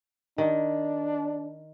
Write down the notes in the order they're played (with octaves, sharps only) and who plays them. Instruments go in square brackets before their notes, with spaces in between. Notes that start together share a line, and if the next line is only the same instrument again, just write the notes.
[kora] D#3 [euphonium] D4